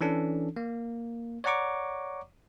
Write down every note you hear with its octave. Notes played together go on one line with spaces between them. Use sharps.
E3 C#4 D4 A4
A#3
C#5 D5 F#5 A#5 C#6 D6